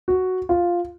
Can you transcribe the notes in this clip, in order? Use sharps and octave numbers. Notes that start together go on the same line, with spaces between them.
F#4
F4